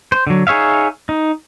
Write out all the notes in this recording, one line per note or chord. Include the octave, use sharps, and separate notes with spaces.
C5
D3 F#3
D#4 G#4 C#5 E5 F5
D#4